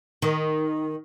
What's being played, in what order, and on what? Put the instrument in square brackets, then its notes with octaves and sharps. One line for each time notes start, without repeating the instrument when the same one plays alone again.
[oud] D#3